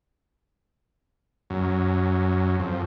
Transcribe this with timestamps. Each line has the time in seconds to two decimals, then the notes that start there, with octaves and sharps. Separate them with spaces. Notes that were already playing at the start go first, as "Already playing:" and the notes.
1.50 F#2
2.60 F2